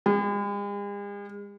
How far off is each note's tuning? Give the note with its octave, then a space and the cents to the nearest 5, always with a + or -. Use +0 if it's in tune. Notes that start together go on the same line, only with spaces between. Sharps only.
G#3 -45